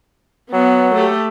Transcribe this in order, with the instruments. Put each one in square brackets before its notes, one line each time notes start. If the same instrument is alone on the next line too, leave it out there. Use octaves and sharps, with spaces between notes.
[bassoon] F#3 [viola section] B3
[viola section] A3 G4 A4